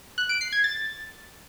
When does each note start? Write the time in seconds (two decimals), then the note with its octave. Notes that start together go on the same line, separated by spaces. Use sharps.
0.18 F#6
0.29 D7
0.41 C7
0.52 G#6
0.64 A6